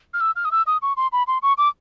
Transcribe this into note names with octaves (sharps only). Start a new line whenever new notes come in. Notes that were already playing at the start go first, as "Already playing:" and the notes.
F6
E6
F6
D#6
E6
D#6
C#6
C6
B5
C6
C#6
D6